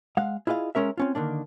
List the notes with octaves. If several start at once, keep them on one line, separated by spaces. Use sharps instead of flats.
G#3 F5 F#5
E4 F4 G#4 D#5 F5
G#3 C#4 A#4 E5
C4 C#4 F4
D3 D#3 A#3 D4